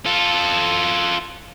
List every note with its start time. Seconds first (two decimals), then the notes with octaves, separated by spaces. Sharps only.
0.06 F4 A4